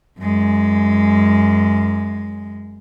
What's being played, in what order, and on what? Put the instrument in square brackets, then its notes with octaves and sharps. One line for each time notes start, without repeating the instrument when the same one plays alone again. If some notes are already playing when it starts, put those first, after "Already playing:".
[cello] F#2 G#3